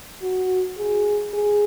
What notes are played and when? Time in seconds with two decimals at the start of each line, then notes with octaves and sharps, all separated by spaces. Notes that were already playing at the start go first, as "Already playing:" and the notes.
0.22 F#4
0.78 G#4
1.34 G#4